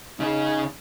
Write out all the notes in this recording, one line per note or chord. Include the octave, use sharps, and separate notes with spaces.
C#3 D#4 G#4